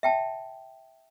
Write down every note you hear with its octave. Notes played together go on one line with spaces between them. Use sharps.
E5 G5 A5